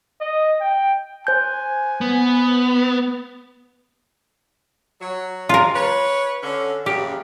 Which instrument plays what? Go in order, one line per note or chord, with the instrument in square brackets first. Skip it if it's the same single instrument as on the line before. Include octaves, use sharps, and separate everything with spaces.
[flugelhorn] D#5
G5
[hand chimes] C5 G6 [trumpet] G#5
[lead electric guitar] B3
[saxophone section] F#3
[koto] F4 A#4
[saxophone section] B4 C#5
D3 C#4
[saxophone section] F#2 A#2 C#3 [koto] G4